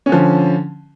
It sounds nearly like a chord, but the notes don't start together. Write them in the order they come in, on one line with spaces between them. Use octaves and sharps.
C#4 D3 F3